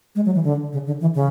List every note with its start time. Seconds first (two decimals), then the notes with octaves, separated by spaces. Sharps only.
0.15 G#3
0.25 F#3
0.35 E3
0.44 D3
0.73 C#3
0.87 D3
1.01 E3
1.15 C#3